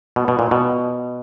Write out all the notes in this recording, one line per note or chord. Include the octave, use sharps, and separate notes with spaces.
B2
B2
A#2
B2